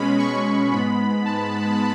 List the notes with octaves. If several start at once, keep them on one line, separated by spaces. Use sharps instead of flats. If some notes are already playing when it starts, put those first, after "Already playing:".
Already playing: B2 G#3 C#4 B5
C#6
G#2 G#3 B3 B5
A5